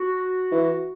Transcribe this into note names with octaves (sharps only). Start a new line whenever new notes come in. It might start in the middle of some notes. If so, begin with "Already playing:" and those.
Already playing: F#4
E3